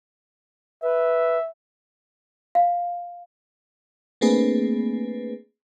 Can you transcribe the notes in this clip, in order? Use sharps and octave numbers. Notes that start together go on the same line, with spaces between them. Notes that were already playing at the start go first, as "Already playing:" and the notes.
B4 E5
F5
A3 A#3 C4 D4 G#4 B4